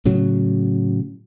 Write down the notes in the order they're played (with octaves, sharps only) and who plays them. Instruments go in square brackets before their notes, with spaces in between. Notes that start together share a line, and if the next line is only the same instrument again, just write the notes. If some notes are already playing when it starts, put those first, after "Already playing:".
[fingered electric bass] A2 C#3 F#3